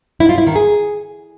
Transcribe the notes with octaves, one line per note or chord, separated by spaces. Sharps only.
E4
F4
E4
D#3
G#4